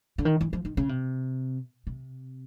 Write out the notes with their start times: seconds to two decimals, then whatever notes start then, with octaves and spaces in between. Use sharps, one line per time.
0.18 D3
0.25 D#3
0.41 E3
0.53 F3
0.65 D#3
0.77 C#3
0.89 C3
1.87 C3